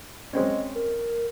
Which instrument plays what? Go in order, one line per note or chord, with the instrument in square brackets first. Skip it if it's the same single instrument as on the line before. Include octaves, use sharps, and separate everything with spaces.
[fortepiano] G#3 C4 C#4 [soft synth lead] D#5
[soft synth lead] A#4